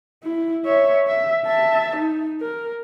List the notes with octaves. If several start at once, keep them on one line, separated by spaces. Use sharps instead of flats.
E4
C#5 E5
E5
E5 A5
D#4
A#4